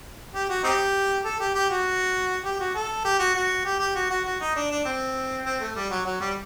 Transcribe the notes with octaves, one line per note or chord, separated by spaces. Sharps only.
G4
F#4
C4 D#4 G4
A4
G4
G4
F#4
G4
F#4
A4
G4
F#4
F#4
G4
G4
F#4
F#4
F#4
D#4
D4
D4
C4
C4
A3
G3
F#3
F#3
G3